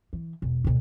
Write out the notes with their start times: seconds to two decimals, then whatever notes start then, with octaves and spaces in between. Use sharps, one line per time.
0.13 E3
0.42 E1
0.64 D2 B2